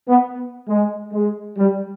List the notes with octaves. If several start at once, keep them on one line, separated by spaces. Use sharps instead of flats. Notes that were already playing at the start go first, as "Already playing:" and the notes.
B3
G#3
G#3
G3